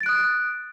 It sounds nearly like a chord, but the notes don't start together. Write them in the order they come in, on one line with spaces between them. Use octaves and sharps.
A6 D7 F#6 D#6